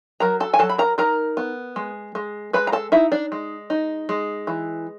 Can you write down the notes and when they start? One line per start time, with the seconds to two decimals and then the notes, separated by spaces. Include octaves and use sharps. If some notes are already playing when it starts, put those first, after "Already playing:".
0.20 F#3 A#4 A#5
0.40 A4 A5
0.54 G#5
0.59 F#3 A4 A5
0.69 B5
0.78 A#4 A#5
0.98 D#4 A#4 A#5
1.37 B3
1.76 G#3
2.15 G#3
2.53 G#3 B4 B5
2.67 A#5
2.72 A4 A5
2.92 D#4 E4 E5
3.12 D4 D5
3.32 G#3
3.70 D#4
4.09 G#3
4.47 E3